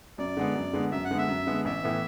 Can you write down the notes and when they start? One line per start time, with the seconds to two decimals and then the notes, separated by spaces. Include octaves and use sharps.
0.18 F#2 D5
0.37 D3 G#3 B3
0.55 F#2
0.73 D3 G#3 B3
0.92 F#2 E5
1.05 F#5
1.11 D3 G#3 B3
1.18 E5
1.28 F#2
1.47 D3 G#3 B3
1.65 A1 E5
1.84 A2 E3 B3